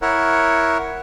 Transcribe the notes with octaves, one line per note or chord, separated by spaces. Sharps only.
E4 A#4 C#5 F#5